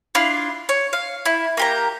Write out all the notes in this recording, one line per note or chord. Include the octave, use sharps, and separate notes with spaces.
D4 E4 F4
C#5
F5
E4
A#3 G4 A#5